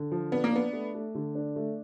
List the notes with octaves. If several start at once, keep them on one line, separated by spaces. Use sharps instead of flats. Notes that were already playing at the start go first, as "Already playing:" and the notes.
Already playing: D3
F3
B3 D4
A#3
B3 D4
A3
A3
D3
D4
A3